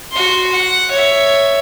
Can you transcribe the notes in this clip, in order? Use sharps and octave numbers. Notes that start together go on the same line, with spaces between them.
F#4 C6
F#5
C#5 E5